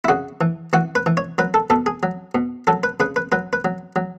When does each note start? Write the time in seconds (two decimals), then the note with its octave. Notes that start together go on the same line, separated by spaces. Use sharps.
0.05 E4
0.08 C#3 F#4
0.41 E3
0.73 E3 F#4
0.95 B4
1.06 E3
1.17 C#5
1.38 F#3 B4
1.54 A4
1.70 B2 A4
1.86 G#4
2.03 F#3
2.35 B2
2.67 F#3 A4
2.83 B4
3.00 C#3 B4
3.16 B4
3.32 F#3 B4
3.53 B4
3.65 F#3
3.96 F#3